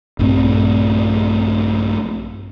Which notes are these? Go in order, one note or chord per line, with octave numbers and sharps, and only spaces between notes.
A#1 G2 A3 C4